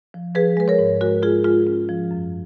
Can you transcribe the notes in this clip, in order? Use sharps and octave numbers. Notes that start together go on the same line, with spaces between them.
F3
F3 G#4 B4
G#3 B4
A#4 C#5
G#2
G#3 F#4 A#4
G#3 F4 G#4
G#3 F4
C#4
F3
F#2